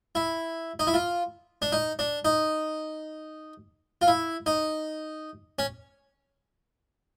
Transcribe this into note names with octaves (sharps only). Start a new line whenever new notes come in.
E4
D#4
E4
F4
D4
D#4
D4
D#4
F4
E4
D#4
C#4